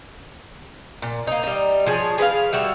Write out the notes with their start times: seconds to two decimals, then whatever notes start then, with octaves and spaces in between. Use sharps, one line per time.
1.02 A#2
1.27 A#3 D#4
1.43 G3 D#4
1.86 F3 G#4 C#5
2.18 G#4 B4 D5 F5
2.53 G3 F#4 E5